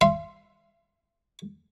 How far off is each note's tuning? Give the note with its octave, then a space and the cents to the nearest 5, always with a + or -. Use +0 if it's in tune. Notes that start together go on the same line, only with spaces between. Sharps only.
E5 +45 C6 +0